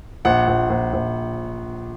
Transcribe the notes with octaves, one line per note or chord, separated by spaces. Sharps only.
A#1 F#5
A#1
A#1
A#1